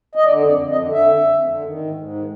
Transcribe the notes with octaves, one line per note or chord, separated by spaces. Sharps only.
D#5
D3 D5
F2
D5
F2
D#5
D3
D3 E5
F2
F2
D3
D#3
G#2
G#2
D#3